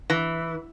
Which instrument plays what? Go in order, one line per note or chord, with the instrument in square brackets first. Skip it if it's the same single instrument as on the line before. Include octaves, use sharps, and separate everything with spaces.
[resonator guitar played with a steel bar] E3